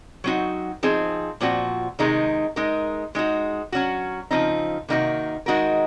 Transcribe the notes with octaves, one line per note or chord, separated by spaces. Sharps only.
F#3 C4 D#4 F#4
F3 C4 D#4 G#4
A#2 F3 C4 F#4
C3 D#3 G#3 D#4
G#3 D#4 A#4
G#3 D#4 F#4
F#3 C#4 F#4
C#3 F3 C4 D#4
C3 D#3 A#3 D#4 F#4
D#3 G#3 D#4 F#4 A#4